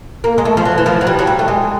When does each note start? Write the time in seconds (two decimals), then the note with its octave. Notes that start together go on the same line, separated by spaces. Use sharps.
0.24 A#3
0.38 G#3
0.45 A3
0.57 F3
0.65 F#3
0.78 E3
0.86 F3
1.01 F#3
1.07 G3
1.19 F#3
1.27 G3
1.39 A3
1.48 G#3